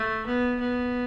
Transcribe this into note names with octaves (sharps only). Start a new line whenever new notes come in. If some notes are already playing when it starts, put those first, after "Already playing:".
Already playing: A3
B3
B3